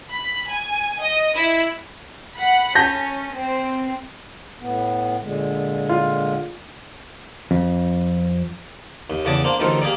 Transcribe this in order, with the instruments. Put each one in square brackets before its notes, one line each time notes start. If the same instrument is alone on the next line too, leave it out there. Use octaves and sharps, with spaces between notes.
[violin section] B5
G#5
D#5
E4
[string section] F#5 B5
[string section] C#4 [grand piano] A5 G6 A#6
[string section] C4
[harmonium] A2 B3
A#2 D3 G#3
[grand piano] F4
[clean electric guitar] F2
[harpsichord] D#2
E2 C#3 G#4 D5 A5
A#3 D4 C5
A1 D2 D#3 A4 A#4 C5
A#3 G4 G#4 D5